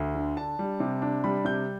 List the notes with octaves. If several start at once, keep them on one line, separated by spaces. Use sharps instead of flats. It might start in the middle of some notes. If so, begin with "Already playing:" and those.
Already playing: D2
D3
D4 A5
G3
C3
D4
G3 B5
C3 G6